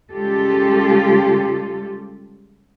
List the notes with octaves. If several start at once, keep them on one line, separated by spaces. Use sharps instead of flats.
C#3 G3 G#3 F4 G4 A4